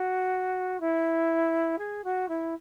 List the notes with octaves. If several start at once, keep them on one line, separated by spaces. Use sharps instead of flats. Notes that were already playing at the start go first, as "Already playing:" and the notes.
Already playing: F#4
E4
G#4
F#4
E4